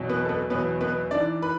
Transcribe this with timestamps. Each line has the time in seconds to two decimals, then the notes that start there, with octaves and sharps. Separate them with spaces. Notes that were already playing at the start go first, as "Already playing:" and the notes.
Already playing: E2 B2 F#3
0.09 B3 B4
0.25 A4
0.29 B3 B4
0.50 E2 B2 F#3 B3 B4
0.81 B3 B4
1.11 G#2 E3 D4 D5
1.42 B4 B5